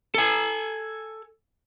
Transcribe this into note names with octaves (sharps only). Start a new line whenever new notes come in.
A4 G#5